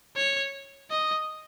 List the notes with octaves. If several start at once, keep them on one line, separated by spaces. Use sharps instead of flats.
C#5
D#5